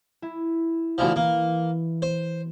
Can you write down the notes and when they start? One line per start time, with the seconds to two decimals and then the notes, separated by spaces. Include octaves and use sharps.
0.22 E4
0.98 D2 E3 F3
1.16 E3 A#3
2.02 C5